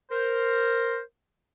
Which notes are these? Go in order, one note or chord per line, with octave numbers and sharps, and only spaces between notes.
A#4 C5